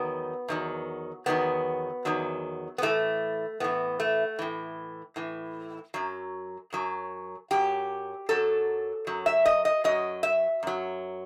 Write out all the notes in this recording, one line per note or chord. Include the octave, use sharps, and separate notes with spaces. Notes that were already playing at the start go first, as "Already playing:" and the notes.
Already playing: E2 D#3 F#3 B3
E2 D#3 F#3
E2 D#3 F#3 B3
E2 D#3 F#3
B3
A2 E3 A3
A2 E3 B3
A3
A2 E3
A2 E3
F#2 F#3
F#2 F#3
F#2 F#3 G4
F#2 F#3 A4
F#2 F#3
E5
D#5
D#5
F#2 F#3 D#5
E5
F#2 F#3